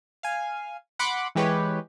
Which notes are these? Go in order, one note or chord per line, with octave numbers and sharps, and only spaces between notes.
F5 G#5
F#5 B5 C6 D6 F#6
E3 G#3 G4 B4 C#5